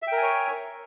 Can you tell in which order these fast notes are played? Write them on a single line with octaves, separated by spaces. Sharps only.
E5 G5 A#4 G#5 C#5